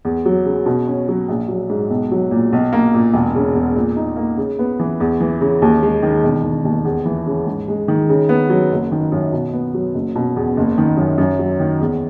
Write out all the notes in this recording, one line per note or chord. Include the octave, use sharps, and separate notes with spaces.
E2
F#3
C#3
B2
C#4
F#3
A#1
F#3
G#2
B1
F#3
A#2
B1
A#3
A#2
E1
C#3
E2
A#2
D#4
A#3
C#3
B3
E3
E2
E3
C#3
D#2
G#3
D#3
E1
D#3
D#2
E2
E3
C#3
G#2
G#3
D#3
C#3
B3
F#3
F#1
D#3
F#2
B2
B3
F#3
F#1
B2
E2
F#1
D#3
F#2
F#2
F#3
D#3
E2